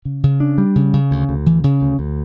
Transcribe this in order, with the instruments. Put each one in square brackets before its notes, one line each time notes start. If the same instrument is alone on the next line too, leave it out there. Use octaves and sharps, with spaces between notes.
[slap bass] C#3
C#3
D4
G3
C#3
C#3
D2
D2
E3
C#3
D2
D2